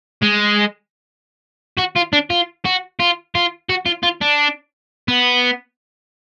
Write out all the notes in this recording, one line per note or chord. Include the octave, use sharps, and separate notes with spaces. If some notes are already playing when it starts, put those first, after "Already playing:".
G#3
F#4
F4
D4
F4
F#4
F4
F4
F#4
F4
F4
D4
B3